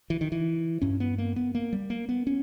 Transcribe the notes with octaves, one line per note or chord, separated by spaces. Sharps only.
E3
D#3
E3
G2 C#4
B3
A#3
B3
A#3
G3
A#3
B3
C#4